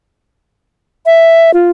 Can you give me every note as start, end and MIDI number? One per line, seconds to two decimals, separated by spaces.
1.06 1.51 76
1.54 1.71 65